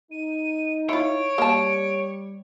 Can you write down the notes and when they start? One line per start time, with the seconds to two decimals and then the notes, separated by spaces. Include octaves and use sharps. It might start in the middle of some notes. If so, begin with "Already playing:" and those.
0.12 D#4 D#7
0.89 E4 F4 C#5 D7
1.38 G3 A#3 A5